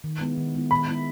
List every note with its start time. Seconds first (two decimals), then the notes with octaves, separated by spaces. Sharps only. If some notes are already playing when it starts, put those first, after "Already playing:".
0.04 D#3
0.20 G#3 B3 E4
0.37 D#3
0.55 G#3 B3 E4
0.71 D#3 B5
0.88 G#3 B3 E4